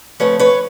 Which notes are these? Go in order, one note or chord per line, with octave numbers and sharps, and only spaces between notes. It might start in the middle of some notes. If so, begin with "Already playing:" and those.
C#3 F3 A3 C4 B4 C#5
B4 C#5